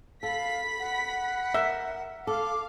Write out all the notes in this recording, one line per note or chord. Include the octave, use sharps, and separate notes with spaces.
A4 F5 B5 B6
F#5
A#4 E5
A4 F5 D6